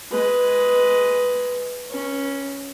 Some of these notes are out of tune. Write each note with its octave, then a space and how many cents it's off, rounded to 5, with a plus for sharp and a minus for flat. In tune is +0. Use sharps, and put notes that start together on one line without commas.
G#3 +5 B4 +0
C#4 +0 B4 -30